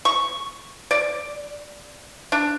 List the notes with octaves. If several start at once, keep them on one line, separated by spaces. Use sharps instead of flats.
C#6
D5
D4